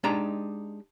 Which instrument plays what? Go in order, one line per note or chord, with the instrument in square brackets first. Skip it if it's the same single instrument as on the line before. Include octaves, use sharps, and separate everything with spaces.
[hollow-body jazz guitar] G#3 D4 D#4 G4 A5 A#5